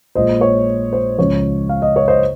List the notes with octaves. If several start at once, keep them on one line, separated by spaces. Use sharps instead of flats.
A#1 A#2 G#3 C5 D#5
C#5
C5
C#2 C#3 F3 C#5
F5
D#5
C#5
C5 D#5